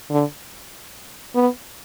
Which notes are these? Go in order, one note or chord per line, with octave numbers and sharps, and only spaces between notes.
D3
B3